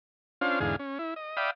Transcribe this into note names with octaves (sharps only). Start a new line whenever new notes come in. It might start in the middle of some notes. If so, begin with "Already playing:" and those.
C#4 D4 F4 C5 F5
E2 G#2 D3 G#4 F5
C#4
E4
D#5
D5 E5 F5 G5 B5 D#6